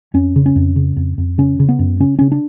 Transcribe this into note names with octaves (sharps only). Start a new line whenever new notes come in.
F2 C#4
C#3
C#4
F2
C#3
F2
F2
C#3 C#4
C#3
B3
F#2
C#3 C#4
C#3 C#4
D4